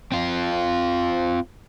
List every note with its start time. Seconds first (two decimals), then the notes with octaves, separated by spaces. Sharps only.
0.12 C4 F4